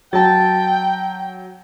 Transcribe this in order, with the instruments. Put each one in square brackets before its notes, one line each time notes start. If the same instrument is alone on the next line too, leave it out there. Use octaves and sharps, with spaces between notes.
[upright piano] F#3 [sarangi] G5 [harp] A5 A6